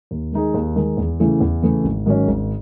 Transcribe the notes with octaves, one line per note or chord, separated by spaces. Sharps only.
D#2
D#3 G#3 D#4 G#4
D#2
D#3 G#3 D#4 G#4
E2
C#3 E3 A3 E4
E2
C#3 E3 A3 E4
G#1
G#2 D#3 F#3 C#4
G#1